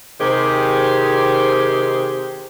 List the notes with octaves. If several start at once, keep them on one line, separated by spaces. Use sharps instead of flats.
C3 D#3 G4 G#4 C5